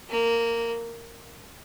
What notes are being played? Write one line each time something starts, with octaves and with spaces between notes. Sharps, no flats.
A#3